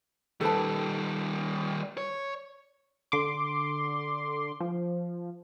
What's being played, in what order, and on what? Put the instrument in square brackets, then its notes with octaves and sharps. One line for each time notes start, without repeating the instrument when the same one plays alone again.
[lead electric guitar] D#3 G3 [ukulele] A4 B4 A5
[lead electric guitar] C#5
[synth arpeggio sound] D3 C6 D6
F3